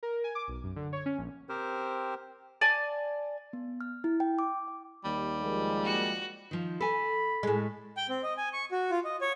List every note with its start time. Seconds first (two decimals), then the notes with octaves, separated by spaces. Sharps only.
0.03 A#4
0.24 G#5
0.35 D6
0.48 B1
0.64 F#2
0.76 D3
0.93 C#5
1.06 C#4
1.18 A#1
1.49 C4 G4 A#4 C5
2.61 D5 G#5 A5
3.53 B3
3.81 F6
4.04 E4
4.20 G5
4.39 D6
4.68 G5
5.05 D#2 G3
5.42 F3 G#3 A#3
5.84 F#4
6.51 D#3 F3
6.80 A4 G#5 B5
7.43 A2 G#3
7.97 G5
8.09 C4
8.23 D#5
8.37 G#5
8.53 C#6
8.72 F#4
8.91 F4
9.05 D#5
9.21 C#5